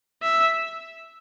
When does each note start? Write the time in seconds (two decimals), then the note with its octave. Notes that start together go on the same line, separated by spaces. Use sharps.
0.23 E5